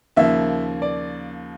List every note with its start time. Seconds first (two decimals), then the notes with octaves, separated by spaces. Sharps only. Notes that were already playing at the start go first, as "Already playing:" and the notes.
0.16 D#2 C#3 F3 A#3 E5
0.82 D5